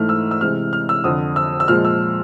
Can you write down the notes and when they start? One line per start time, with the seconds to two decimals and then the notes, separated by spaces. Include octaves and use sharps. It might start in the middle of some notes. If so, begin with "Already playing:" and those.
Already playing: G#2 E3 A3 F6
0.09 E6
0.31 E6
0.41 C3 E3 G#3 F6
0.73 F6
0.89 E6
1.04 F2 D3 F3 D#6
1.36 E6
1.60 E6
1.68 A#2 F3 G#3 F6
1.85 E6